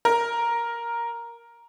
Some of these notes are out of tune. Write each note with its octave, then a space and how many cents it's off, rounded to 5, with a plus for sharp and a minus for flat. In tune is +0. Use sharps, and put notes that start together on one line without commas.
A#4 +5